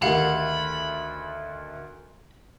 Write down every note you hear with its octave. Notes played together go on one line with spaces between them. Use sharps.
D2 D#3 G4 F5 F#5 B5